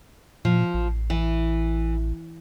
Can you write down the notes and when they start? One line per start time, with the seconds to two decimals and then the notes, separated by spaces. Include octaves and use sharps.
0.45 A#2 F3
0.74 A1
1.10 E3